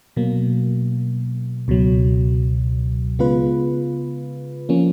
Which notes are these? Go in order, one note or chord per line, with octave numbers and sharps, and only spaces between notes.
B2 F#3 A#3
C#2 B2 F#3
C#3 G#3 B3 F4 B4
F3 A#3 C#4